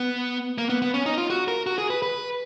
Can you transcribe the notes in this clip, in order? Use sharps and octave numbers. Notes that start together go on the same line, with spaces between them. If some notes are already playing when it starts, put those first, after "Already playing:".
Already playing: B3
A#3
B3
B3
C#4
D#4
F4
F#4
A#4
F#4
G#4
B4
B4